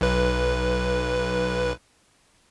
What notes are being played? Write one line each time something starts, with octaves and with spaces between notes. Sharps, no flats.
B1 B4